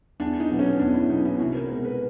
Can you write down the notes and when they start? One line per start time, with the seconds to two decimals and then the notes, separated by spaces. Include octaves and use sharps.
0.20 E2 D4
0.40 D#4
0.50 B2 F#3 B3
0.59 C#4
0.79 E2 D4
0.94 E4
1.09 B2 F#3 B3 D#4
1.25 E4
1.39 C2 F#4
1.55 A#4
1.70 B2 G#3 A#4
1.84 B4